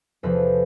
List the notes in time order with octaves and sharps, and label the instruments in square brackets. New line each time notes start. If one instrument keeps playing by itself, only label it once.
[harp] E2 C3 F3 A4 B4